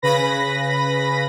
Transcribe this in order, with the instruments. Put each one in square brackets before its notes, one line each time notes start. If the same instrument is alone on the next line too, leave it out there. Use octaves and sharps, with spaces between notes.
[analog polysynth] C#3 B4 B5 A#6